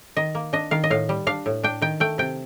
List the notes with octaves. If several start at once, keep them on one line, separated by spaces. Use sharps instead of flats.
D#3 D#5
A#3
D4 D#5
D#3 F5
D#5
A2 F5
G3
D4 F5
A2
D4 G5
D#3 G5
A3 G5
C3 G5